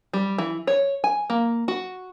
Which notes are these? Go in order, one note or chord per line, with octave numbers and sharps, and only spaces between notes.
G3
E3
C#5
G#5
A#3
F#4